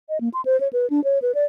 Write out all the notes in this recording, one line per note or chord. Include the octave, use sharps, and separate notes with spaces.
D#5
A#3
C6
C5
C#5
B4
D4
C#5
B4
D5